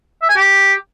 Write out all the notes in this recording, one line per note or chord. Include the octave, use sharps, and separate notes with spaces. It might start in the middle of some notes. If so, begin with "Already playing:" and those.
E5
G#5
G4